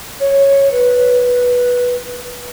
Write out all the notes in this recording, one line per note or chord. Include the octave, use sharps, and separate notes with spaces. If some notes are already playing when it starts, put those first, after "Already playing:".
C#5
B4